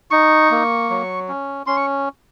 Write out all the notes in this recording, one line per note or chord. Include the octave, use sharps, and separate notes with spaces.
D#4 C#6
A#3
F#3
C#4
C#4 C6
C#6